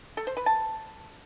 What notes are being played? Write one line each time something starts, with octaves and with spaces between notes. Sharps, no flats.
A4
C5
B4
A5